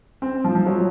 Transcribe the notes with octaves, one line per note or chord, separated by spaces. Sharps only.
C4
F3
F3
F#3